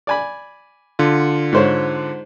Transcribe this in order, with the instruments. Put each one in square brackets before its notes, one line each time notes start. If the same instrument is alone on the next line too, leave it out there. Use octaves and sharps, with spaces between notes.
[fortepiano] D5 G#5 B5
[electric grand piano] D3 F4
[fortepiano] G#2 C5 C#5